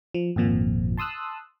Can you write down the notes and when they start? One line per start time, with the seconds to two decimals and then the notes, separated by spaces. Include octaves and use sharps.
0.14 F3
0.36 G#1 F2 A#2 F3
0.97 A5 C6 D#6 E6 F#6